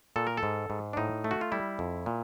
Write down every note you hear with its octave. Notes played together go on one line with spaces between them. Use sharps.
A#2 A4
A#4
A4
G#2
G#2
D4
A2 D#4
A3
F#4
F4
G3 E4
F2
A#2